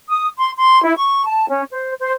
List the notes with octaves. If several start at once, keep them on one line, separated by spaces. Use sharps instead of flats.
D#6
C6
C6
E4
C#6
A5
C#4
C5
C5